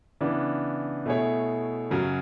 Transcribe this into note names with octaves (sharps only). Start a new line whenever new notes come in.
C#3 E3 B3 D4
B2 A3 E4 G#4 C#5
F#2 C#3 F#3